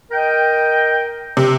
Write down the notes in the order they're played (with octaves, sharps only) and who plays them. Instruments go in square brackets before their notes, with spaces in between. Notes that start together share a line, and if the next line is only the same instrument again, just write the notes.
[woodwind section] A#4 D#5 G5
[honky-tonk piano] C3